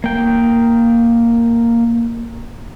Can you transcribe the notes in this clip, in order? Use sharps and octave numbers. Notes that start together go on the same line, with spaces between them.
A#3 G5